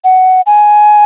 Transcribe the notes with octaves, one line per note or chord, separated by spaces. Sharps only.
F#5
G#5